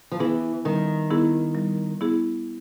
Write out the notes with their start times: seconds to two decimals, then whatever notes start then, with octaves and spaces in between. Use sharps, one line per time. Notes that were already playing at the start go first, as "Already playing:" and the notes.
0.12 F3
0.20 E3 B3 E4 G#4
0.65 D#3 G3
1.10 B3 E4 G#4
1.55 G3
2.01 B3 E4 G#4